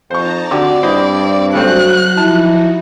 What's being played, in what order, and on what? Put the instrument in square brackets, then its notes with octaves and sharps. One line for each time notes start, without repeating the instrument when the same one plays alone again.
[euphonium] F2 [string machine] D#4 A5 A#5 [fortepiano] C5 C#6
[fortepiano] D3 G4 [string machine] C4 [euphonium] F#4 [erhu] D5
[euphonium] G2 [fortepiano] E4 C5 D#5
[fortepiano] C#3 A3 C4 [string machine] F#3 F#4 [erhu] F#6
[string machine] F3 D#4 F#4 [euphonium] E4 [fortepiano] A5